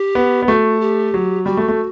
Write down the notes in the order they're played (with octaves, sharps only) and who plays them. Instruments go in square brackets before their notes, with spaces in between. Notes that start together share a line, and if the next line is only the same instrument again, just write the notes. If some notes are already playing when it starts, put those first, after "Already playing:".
Already playing: [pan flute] G4
[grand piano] B3
B3
[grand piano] A3 [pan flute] F#4
[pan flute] G4
[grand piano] F#3
[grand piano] G3 [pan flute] F#4
[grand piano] A3
A3